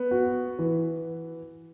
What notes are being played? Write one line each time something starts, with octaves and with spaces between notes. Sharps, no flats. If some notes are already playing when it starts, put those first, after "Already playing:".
Already playing: B3
F#4
E3